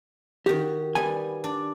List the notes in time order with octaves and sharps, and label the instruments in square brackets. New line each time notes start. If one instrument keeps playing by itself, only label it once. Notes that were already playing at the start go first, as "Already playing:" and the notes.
[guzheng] D#3 F#4 [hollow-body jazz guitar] G4
[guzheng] G3 B3 [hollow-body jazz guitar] G#5
[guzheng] D4